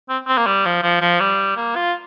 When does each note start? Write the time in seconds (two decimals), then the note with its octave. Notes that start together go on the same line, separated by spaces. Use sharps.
0.09 C4
0.27 C4
0.37 A#3
0.46 G3
0.65 F3
0.83 F3
1.01 F3
1.20 G3
1.57 A#3
1.76 F4